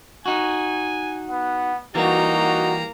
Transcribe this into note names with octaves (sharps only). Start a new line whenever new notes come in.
D#4 F#4 G#5
B3 F#5
E3 G3 A#3 D#4 F#4 A#5